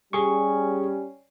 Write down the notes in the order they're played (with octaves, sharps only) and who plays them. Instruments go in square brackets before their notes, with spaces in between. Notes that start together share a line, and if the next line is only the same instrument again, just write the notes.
[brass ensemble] G3 C#4 [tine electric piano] G#4 C#6